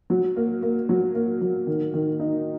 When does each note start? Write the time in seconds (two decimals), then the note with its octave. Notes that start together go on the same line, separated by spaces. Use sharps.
0.10 F#3
0.36 A#3
0.62 A#3
0.89 F#3
1.15 A#3
1.41 F#3
1.67 D#3
1.94 D#3
2.20 D#4